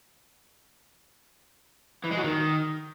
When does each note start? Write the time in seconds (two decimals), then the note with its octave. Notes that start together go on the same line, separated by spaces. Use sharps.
2.04 E3
2.11 G#3
2.18 F#3
2.24 D#3